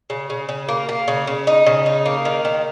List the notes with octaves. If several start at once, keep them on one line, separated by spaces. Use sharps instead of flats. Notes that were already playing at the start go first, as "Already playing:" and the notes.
C#3
C#3
C#3
A#3
A#3
C#3
C#3
D#4
C#3
D#4
A#3
D#3
D#3